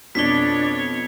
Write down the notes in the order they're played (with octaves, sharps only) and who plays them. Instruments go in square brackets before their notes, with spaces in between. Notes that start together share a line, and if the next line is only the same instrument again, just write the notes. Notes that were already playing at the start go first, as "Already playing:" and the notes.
[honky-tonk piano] F2 B2 [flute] D4 [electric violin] C#5 [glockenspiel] B6 G7